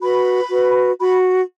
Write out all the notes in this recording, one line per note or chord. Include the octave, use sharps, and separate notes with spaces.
F#4 B4 B5
F#4 B4
F#4 B5